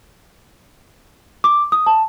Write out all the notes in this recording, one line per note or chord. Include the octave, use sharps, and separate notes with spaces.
D6
D#6
A5